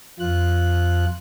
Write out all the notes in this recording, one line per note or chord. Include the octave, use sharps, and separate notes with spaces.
F2 F3 F4 F#6